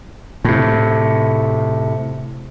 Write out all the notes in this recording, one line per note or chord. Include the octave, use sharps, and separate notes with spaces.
A2 C3